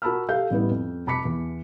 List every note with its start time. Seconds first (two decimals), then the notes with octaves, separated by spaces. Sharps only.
0.02 F#4 A#4 A5 B5 E6 F6
0.29 G4 A4 F5 G6
0.51 A1 G3 B3 E4
0.70 F2
1.07 F1 A5 B5 D6 B6 C#7
1.25 E2